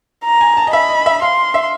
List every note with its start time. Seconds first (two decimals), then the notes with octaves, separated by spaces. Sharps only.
0.24 A#5
0.41 G#5
0.57 A5
0.67 D#5
0.73 E5 B5
0.89 D#5
1.06 E5
1.22 F5 C6
1.54 E5